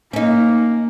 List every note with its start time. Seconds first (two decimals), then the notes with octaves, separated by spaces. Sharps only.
0.13 A#3 C#4 D#4